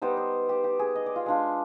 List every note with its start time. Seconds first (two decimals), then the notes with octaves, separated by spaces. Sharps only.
0.02 G3 B3 D#4 C5
0.17 C5
0.49 G4
0.64 G4
0.79 G#4
0.95 D#5
1.06 D5
1.16 F4
1.26 G#3 D4 F4